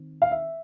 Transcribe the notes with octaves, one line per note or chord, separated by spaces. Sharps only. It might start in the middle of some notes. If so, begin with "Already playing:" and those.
Already playing: D#3 C4
F5
E5